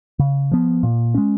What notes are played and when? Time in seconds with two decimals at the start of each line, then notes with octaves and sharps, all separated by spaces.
0.19 C#3
0.51 F3 B3
0.83 A#2
1.14 G#3 C#4